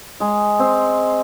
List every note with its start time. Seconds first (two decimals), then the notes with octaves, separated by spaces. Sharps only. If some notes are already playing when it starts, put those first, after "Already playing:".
0.20 G#3
0.59 C4